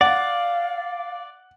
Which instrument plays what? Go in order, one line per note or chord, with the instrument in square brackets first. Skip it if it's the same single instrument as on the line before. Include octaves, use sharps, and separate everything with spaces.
[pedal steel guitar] D5 [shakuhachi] F5 [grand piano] F#5